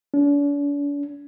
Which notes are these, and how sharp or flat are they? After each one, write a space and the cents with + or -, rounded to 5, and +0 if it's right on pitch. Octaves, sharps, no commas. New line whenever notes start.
D4 -45